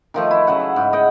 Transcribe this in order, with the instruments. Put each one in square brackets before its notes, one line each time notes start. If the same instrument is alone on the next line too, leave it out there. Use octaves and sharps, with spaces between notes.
[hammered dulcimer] D#3 F3 A3
E4
C#3 F#3 F#5
G#4
G#2
D#5 F#5 G5